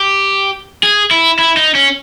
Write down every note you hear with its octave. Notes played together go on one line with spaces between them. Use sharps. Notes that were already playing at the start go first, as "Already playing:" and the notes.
Already playing: G4
G#4
E4
E4
D#4
C#4